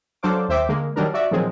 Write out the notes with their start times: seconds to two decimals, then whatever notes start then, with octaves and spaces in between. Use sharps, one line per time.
0.23 F#3 D4 A4 C5 F5 D6
0.49 D#2 C5 E5 G5 D6
0.69 D3 G#3 A#3
0.96 D#3 F#3 G3 D4 A#4
1.14 F#4 D5 E5
1.31 A#2 D#3 F3 F#3 G#3 C4